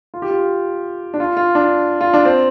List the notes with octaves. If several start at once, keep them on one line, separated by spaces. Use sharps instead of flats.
F4
G4
F4
D4
F4
F4
D4
F4
D4
C4